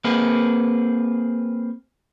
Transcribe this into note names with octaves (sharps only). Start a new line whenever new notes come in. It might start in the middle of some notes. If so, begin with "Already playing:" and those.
A#3 C4 G#4 B4